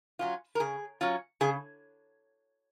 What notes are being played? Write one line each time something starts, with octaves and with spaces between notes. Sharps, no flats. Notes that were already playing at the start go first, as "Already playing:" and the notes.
F#3 C#4 F4
A#4
C#3 G#4
F#3 C#4 F4
C#3 G#4